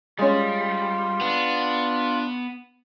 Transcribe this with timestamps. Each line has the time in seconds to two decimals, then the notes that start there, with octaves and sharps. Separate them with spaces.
0.19 G3 G#3 C#4 F4
1.21 B3 D4